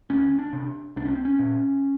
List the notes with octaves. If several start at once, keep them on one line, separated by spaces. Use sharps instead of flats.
D2 C#4
D4
C3
C2 D4
C#4
C4
C#4
A#2